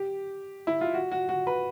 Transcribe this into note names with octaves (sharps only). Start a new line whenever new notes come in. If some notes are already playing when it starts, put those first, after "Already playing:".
Already playing: G4
E4
F4
F#4
F#4
F#4
B4